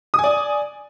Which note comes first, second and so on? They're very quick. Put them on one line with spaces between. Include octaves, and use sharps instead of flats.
D#6 G#5 D5